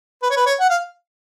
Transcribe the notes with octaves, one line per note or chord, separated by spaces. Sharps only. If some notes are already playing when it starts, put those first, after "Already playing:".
B4
C#5
B4
C#5
F#5
F5